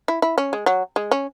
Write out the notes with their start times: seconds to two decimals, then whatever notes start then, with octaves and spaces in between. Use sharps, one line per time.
0.08 E4
0.22 E4
0.38 C#4
0.53 G#3
0.66 F#3
0.96 G#3
1.11 C#4